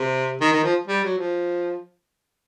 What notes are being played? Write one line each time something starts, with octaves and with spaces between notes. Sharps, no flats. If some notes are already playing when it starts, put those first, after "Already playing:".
Already playing: C3
D#3
D#3
F3
G3
F#3
F3